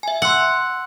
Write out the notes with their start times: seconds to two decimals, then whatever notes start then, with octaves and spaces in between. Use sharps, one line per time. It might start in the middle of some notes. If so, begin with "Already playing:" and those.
0.03 E5 G#5
0.22 F#5 C6 E6